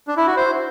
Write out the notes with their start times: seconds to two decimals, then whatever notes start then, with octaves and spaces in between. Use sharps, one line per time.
0.07 D4
0.17 E4
0.27 F#4
0.37 C5